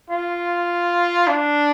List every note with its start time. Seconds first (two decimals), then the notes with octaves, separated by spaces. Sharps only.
0.10 F4
1.27 D4